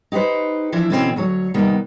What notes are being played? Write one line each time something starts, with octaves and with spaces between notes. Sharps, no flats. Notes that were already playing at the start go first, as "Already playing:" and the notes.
D#4 G4 G#4 B4 C5
E3 F3 D4 E4
B2 D3 E3 A#3 C4 C#4
D2 F#3 A4 C#5
C3 D#3 G3 A#3 B3